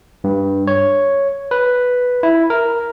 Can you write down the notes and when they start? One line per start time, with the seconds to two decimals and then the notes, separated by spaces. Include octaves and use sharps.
0.24 G2
0.67 C#5
1.51 B4
2.23 E4
2.50 A#4